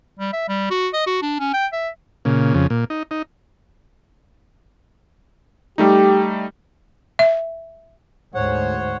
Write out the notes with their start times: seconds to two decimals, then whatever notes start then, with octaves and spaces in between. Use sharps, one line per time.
0.19 G3
0.33 E5
0.48 G3
0.70 F#4
0.93 D#5
1.07 F#4
1.22 D4
1.39 C#4
1.54 G5
1.72 E5
2.25 A#2 C#3
2.54 F2 C#3
2.70 A#2
2.90 D#4
3.11 D#4
5.78 G3 A3 D#4 G4
7.19 E5
8.35 D2 G#2 C5 C#5 F#5